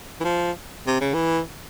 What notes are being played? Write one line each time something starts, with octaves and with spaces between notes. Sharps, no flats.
E3
F3
C3
C#3
E3